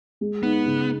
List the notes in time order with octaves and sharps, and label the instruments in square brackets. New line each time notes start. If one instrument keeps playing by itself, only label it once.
[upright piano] G#3
[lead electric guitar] B3 [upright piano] D#4
[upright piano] C#3